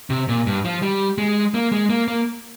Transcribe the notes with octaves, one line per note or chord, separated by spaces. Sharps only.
C3
A#2
G2
F3
G3
G#3
A#3
G#3
A#3
A#3